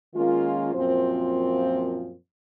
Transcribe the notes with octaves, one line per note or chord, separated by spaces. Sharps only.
D#3 G#3 A#3 C#4 F4
F#2 A#2 F3 C4 F4 C5